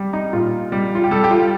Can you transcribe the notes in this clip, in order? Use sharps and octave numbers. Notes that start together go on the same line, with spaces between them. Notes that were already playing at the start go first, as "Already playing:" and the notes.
Already playing: G3
D#4
A#2 F4
G3
F4
G4
G3 A4
G4
F4